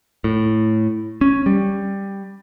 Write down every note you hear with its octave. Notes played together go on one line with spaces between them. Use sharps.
A2
C#4
G3